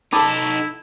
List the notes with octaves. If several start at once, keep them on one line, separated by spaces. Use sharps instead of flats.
D#4 E4 A4 A5 B5 D6